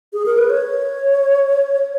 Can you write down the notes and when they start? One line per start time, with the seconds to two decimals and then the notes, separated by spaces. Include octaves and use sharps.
0.13 G#4
0.26 A#4
0.38 B4
0.50 C#5